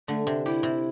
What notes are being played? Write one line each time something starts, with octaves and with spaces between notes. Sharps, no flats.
D3 A3
C3 D4
E4 G4
C3